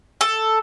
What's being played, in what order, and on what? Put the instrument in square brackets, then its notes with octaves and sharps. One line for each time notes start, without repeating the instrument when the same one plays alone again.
[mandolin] A4